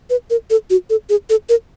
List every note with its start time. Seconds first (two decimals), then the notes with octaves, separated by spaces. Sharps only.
0.10 B4
0.30 A#4
0.50 A4
0.70 F#4
0.90 A4
1.09 G#4
1.30 A4
1.49 A#4